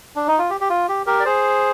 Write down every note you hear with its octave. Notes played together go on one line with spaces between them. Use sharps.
D4
D#4
F4
G4
G4
F4
G4
G4 A#4
D5
G#4 C5